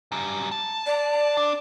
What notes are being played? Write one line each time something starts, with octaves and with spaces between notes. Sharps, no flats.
F#2 G3
A5
D5
D4